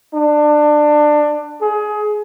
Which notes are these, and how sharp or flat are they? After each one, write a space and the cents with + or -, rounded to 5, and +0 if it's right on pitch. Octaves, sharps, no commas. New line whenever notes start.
D4 +20
G#4 +20